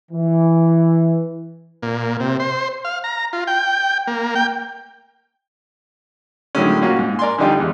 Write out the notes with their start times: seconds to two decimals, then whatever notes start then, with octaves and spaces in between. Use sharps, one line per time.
0.11 E3
1.83 A#2
2.20 C3
2.40 C5
2.85 F5
3.04 A#5
3.33 F4
3.47 G5
4.07 A#3
4.35 G5
6.55 A2 D3 D#3 F#3 G#3 C#4
6.81 A#2 A#3 C#4 F#4
6.99 G#2
7.19 A#4 D5 G#5 C6
7.38 D3 F3 G3 D#4 F4 G4
7.57 E2 G#3